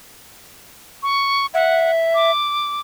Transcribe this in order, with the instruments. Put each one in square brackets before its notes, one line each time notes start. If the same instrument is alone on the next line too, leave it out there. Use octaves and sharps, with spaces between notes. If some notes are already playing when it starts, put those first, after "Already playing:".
[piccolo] C#6
[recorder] E5 [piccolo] F#5
[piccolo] D6